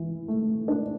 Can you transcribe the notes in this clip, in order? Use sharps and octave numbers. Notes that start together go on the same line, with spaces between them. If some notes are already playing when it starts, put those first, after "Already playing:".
Already playing: E3
A3
D4